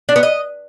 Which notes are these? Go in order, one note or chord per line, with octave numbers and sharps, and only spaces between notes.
D4
B3
D#5